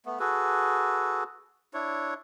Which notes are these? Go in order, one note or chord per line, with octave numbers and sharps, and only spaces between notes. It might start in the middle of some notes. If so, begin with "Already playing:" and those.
A3 B3
F#4 G#4 A4 B4
D4 E4 C#5